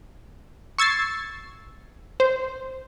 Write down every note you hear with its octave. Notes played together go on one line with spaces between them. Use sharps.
C#6 E6 G#6 A6 C7
C5